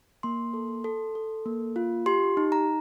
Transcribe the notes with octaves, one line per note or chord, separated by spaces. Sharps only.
A#3 C6
A4
A4
A4
A#3
F4
G4 C6
D#4
A#5